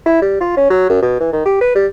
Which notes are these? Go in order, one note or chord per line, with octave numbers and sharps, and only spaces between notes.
E4
G3
F4
C#4
F#3
F#2
B2
E3
D#3
G4
B4
G3